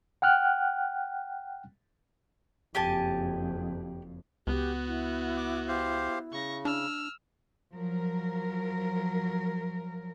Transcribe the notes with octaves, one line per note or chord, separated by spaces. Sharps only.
F#5 G5 F6 F#6
F#1 F2 G4 G#5 A5
C#2 B3 F#4 G4
E4
D6
G4 C5 F5
C#3 C#6 A#6
D4 E6 F6
F3 F#3 A#4